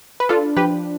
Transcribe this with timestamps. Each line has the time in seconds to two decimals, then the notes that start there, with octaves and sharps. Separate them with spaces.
0.20 B4
0.29 D4 F4 A4
0.57 F3 G4 B4